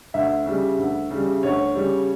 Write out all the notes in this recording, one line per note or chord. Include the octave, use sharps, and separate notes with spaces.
D2 E5
C#3 G3
D2
C#3 G3
D2 C#5
C#3 G3